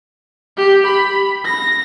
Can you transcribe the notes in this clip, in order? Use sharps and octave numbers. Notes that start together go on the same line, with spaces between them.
G4
B5
A#6